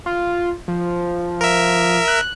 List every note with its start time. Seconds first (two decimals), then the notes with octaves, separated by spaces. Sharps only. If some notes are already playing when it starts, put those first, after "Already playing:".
0.06 F4
0.68 F3
1.41 A#4 E5
2.08 F#6